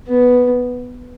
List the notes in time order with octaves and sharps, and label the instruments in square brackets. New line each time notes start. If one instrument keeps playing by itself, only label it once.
[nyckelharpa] B3